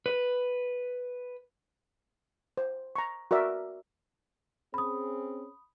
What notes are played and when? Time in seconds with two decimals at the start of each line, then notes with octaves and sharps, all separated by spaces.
0.06 B4
2.57 C5
2.96 A#5 C#6
3.31 F#4 A#4 D5 E5 A#5
4.74 C4 C#4 G#4 B5 D#6